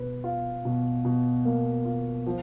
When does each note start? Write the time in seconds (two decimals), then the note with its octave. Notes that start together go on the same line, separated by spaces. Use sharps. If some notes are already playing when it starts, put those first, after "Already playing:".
Already playing: B2 B4
0.24 F4
0.65 B2
1.05 B2
1.45 A#3
1.85 F4
2.27 F3